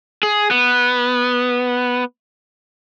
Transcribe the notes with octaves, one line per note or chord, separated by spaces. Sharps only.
G#4
B3